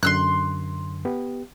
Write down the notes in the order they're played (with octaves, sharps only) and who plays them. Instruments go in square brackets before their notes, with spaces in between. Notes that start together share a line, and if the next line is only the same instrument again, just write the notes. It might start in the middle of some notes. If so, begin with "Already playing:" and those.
[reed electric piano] F#2 D3 [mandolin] C6 E6 F#6
[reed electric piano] B3 G4